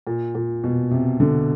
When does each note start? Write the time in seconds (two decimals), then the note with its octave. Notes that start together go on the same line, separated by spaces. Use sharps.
0.07 A#2
0.35 A#2
0.64 B2
0.91 C3
1.20 D3